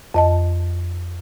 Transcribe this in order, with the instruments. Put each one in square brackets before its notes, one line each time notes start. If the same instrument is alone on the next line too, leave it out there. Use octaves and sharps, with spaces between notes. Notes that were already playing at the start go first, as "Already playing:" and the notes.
[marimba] F2 D#5 A5